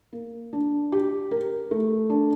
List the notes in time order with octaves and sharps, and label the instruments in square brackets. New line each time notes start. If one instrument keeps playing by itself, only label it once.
[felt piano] A#3
D4
G4
A#4
A3
D4